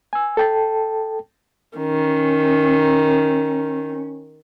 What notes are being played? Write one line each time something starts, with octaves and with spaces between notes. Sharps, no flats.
G#5 E6
A4 G5 A5
D#3 C#4